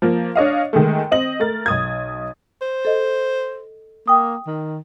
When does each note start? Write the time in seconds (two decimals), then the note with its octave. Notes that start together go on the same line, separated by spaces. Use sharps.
0.02 F3 A#3
0.35 D4 C#5 D#5 F5
0.73 D#3 G#3 A3
1.11 C4 D#5 F#7
1.40 A3 A#4 A6
1.66 B1 D#6 G#6
2.61 C5
2.85 A4 D#5
4.08 A#3 G5 D#6
4.47 D#3